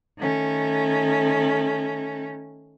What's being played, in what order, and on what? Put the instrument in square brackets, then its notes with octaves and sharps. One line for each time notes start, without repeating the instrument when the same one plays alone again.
[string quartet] D#3 A3 C#4